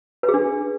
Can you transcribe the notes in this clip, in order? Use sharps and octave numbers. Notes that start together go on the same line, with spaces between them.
B4
G#4
D4